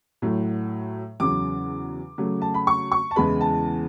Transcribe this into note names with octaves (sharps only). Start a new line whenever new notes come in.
A2 F#3 A3
E2 C#3 F#3 D6
C#3 F#3 A3
A5
B5
C#6
C#6
A5
E2 C#3 E3 G#3 B3 B5
A5